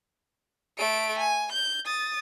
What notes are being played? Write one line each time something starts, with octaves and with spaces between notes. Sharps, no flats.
A3 D7
G#5
G6
D#6 A6